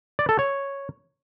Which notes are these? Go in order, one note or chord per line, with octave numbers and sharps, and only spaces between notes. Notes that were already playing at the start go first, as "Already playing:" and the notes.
D5
A4
C#5